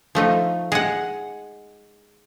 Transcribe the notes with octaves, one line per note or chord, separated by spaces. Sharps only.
F3 A3 D#4
G#3 F#5